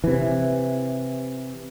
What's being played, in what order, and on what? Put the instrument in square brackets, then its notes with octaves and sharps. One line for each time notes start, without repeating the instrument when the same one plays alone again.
[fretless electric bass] C3 E3